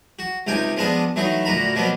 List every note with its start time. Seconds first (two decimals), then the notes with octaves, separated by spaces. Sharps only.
0.19 F#4
0.47 C#2 C3 D#4 G5 G#5
0.77 F3 G#3 B3 D4 D#5
1.16 E3 F#3 A3 D#4
1.45 D2 A#2 F#4 A#5 B5
1.75 B2 F3 F#3 A#3 B3